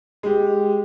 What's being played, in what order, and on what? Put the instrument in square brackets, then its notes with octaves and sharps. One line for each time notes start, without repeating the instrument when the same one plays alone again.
[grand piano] G#3 G4